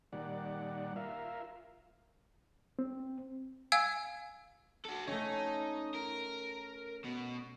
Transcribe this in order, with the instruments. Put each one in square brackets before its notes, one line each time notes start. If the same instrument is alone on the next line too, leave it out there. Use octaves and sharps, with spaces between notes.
[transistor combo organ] A#2 D#3 G3 D5 F#5
F4 A#4 E5 F5
[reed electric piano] C4
[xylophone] F5 G#5 E6 G#6
[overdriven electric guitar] F#4 A4
[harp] A3 C#4 [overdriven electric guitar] D#4
[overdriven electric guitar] A#4
B2